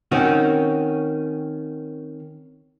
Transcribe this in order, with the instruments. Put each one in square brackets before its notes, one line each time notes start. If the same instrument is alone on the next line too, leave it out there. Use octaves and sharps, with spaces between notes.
[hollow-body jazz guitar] D#3 C4 C#4 F#4